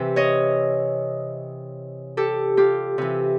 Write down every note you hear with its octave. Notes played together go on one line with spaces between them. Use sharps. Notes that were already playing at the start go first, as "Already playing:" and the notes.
Already playing: C3 E3
C#5 D#5
G4 A4
F4 G4
C3 E3